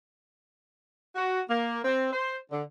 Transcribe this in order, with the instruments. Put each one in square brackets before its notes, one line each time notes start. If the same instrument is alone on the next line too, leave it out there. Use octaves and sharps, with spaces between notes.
[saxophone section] F#4
A#3
C4
C5
D3